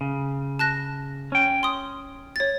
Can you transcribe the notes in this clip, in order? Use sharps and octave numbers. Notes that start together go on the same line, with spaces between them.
C#3
A5 F#6 A#6
C#4 G5
C6 D#6
C#5 A6